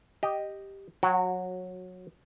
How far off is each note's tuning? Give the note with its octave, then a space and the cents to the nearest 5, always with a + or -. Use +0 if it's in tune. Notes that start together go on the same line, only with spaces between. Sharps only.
G4 +0 D#5 -5
F#3 -20 F#4 +0 F#5 +40